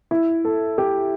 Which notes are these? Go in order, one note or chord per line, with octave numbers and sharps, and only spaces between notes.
E4
A4
G4